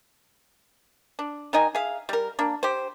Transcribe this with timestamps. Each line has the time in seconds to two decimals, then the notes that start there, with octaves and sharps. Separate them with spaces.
1.19 D4
1.53 D#3 D#4 D#5 G#5
1.75 G#4 E5 F5
2.09 G3 A#4
2.39 A#3 D4
2.63 G4 C5